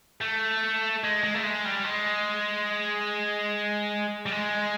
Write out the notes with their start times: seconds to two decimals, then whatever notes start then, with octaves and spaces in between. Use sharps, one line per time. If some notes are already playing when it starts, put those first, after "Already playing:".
0.21 A3
1.04 G#3
1.24 G#3
1.34 A3
1.43 G#3
1.65 G3
1.85 G#3
4.26 G3
4.31 G#3